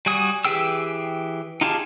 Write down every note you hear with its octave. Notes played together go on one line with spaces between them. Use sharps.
G3 F#4 G#5 D#6
E3 G4 G#4 G5 E6
D#4 F4 G4 G#4 A5